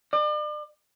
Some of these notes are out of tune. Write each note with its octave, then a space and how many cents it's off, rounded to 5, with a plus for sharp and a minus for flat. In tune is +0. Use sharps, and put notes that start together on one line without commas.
D5 +40